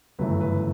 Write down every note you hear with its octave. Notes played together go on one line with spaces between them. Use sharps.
G1 F#2 C#3 E3 A3 B4
B4